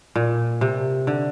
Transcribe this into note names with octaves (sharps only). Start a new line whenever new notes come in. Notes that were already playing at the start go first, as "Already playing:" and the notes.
A#2
C3
D3